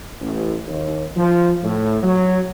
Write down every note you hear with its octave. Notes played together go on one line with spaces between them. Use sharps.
A1
D#2
F3
A2
F#3